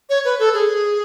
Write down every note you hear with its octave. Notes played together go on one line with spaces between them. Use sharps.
C#5
B4
A4
G#4